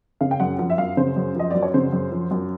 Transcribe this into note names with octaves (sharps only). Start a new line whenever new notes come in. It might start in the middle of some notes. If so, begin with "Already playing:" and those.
C#3 F5
G5
F#2 F#5
F3 F#5
E5
F#2 F5
C#3 C5
F#2
F3 D#5
F#2 D5
C#5
C#3 C5
F#2
F3
F#2